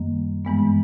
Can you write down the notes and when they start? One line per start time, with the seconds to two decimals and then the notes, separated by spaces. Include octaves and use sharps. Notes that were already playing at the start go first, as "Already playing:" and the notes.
Already playing: F#2 D#3 G3 A#3
0.45 G2 E3 G#3 B3